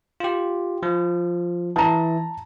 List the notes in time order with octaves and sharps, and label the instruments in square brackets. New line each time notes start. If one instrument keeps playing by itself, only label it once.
[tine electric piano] F4 G4
F3
[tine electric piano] E3 E4 [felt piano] A5 A#5